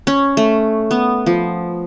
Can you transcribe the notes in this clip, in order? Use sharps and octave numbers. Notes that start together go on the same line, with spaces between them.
C#4
A3
B3
F3